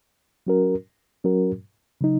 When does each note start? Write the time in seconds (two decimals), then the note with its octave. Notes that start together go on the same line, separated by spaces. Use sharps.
0.47 F#3 C#4 F#4 A#4
1.24 F#3 C#4 F#4 A#4
2.01 C#3 F#3 D#4